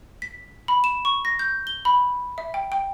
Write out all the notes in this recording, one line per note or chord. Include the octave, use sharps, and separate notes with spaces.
B6
B5
E7
C#6
A#6
G6
G7
B5
E5
G5
G5